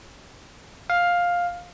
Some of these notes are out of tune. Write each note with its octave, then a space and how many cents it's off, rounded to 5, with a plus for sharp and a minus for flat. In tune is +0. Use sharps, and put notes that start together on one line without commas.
F5 +10